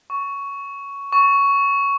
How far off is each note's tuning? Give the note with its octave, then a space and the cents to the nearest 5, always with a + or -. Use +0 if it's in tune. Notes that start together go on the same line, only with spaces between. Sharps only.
C#6 +10
C#6 +10